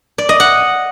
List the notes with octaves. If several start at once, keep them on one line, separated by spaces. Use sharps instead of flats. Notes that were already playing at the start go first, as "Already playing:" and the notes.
D5
D#5
F#5